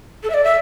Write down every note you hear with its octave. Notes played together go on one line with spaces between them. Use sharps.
A4
E5
D5
E5